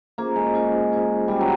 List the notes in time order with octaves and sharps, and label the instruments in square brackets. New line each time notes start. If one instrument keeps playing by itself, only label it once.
[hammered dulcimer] A#3 [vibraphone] C#4 F4 G#4 C5
[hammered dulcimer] G#3
[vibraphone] C#4 F4 G#4 C5
C#4 F4 G#4 C5
[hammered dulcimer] G3 [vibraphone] C#4 F4 G#4 C5
[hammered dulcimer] F#3